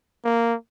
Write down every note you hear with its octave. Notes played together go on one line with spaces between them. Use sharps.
A#3